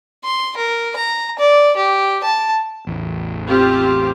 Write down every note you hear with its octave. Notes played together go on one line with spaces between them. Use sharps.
C6
A#4
A#5
D5
G4
A5
A1 E2
C4 F4 G4